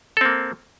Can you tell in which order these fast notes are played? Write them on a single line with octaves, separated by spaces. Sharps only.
A4 C4 A#3